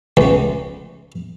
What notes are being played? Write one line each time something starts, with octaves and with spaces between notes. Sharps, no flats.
C#2